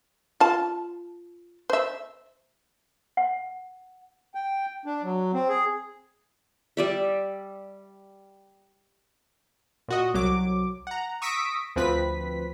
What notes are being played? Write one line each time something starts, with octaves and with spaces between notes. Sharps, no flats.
F4 A5
C5 E5
F#5
G5
D4
F#3
C4
G#4
G3 D5 E5
A#2 F#4 D#5
C2 F#3 D6
F#5 A#5
C#6 D#6 E6 A#6 B6 D7
D2 F3 C4 B4 B6